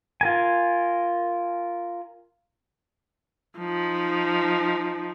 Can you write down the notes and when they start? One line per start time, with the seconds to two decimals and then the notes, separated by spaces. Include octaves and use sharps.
0.21 F4 A#4 G#5
3.59 F3 D#4